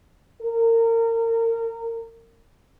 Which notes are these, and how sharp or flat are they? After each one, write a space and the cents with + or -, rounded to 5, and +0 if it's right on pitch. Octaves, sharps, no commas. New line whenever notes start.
A#4 -30